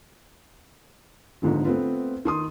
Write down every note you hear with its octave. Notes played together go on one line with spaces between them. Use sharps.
G1 G#2 D3 F3
A3 B3 C4 F4 B4
D#3 C6 D#6